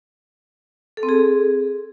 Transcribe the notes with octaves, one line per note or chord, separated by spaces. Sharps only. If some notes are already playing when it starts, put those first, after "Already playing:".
A4
C4
G#4